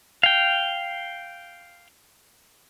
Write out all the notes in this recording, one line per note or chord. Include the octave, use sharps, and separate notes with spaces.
F5 G5